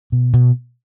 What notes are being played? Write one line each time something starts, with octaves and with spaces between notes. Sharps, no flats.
B2
B2